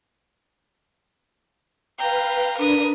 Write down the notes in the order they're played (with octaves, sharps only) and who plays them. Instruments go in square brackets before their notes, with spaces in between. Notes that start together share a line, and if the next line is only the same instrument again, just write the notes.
[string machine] B4 F5 [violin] G5 A#5
[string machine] D4 B4 [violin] A#4 D#6